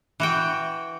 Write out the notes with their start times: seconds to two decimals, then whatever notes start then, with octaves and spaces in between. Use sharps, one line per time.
0.20 E3 F#4 G5